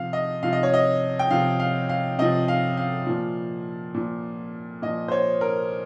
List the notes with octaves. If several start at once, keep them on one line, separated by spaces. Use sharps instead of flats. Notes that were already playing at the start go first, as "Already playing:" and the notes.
Already playing: C3 F3 F5
D#5
C3 F3 F5
D#5
C#5
D#5
G5
C3 F3 F5
F5
F5
C3 F3 D#5
F5
F5
A#2 F3
A#2 F3
A#2 F3 D#5
C5
C#5
A#4